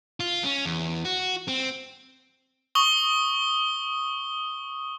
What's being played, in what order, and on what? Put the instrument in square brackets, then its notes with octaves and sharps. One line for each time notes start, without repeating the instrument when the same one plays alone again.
[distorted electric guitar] F4
C#4
E2
F#4
C4
[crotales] C#6 D#6 G7